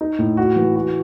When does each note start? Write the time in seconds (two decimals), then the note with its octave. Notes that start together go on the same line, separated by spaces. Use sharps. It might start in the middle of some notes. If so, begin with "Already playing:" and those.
0.01 D#4
0.19 A2
0.37 F#4
0.56 E3
0.76 F#4